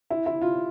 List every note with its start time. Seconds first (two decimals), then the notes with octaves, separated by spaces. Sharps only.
0.10 E4
0.26 E4
0.41 F4